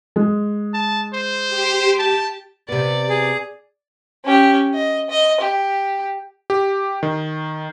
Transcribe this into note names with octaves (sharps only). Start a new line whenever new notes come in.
G#3
A5
C5
G4
A5
C3 B3 D5
G#4
C#4 G4
D#5
D#5
G4
G4
D#3